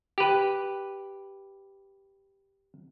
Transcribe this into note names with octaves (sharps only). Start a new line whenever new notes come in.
G4 B4